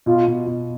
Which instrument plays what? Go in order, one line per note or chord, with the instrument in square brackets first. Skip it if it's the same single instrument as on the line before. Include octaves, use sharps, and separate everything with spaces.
[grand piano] B2 [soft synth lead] F4
[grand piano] B2
B2